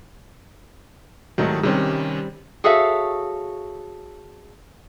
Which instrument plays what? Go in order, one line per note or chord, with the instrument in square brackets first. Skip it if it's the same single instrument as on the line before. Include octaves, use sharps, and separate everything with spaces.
[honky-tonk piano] C2 G#2 D#4 [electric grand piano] D#3 F#3 A3
[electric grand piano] C3 D#3 C#4 [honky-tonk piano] G3 C4
[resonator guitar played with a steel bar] F#4 G#4 A4 C#5 E5 F5